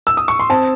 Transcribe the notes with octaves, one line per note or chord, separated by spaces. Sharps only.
E6
D#6
C#6
C6
C4 A5